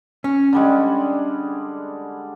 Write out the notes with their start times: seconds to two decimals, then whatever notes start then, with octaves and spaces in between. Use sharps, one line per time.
0.24 C#4
0.53 D3 G3 G#3